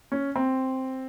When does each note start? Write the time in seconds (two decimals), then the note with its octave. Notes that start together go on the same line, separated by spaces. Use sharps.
0.12 C#4
0.36 C4